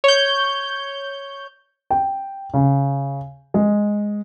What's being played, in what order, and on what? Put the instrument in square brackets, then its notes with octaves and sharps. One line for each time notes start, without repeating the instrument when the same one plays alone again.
[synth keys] C#5 G6
[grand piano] G5
C#3
G#3